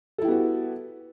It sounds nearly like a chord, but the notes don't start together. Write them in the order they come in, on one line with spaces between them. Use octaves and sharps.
A4 E4 G4 B3 F#4